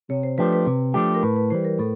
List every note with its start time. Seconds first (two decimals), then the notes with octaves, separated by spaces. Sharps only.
0.10 C3 C#5
0.23 C5
0.38 F3 A3 D4 G4 B4
0.53 B4
0.67 C3
0.94 F3 A3 D4 G4
1.14 A#4
1.22 A2 B4
1.36 B4
1.50 E3 G3 C5
1.65 A#4
1.79 A2 A4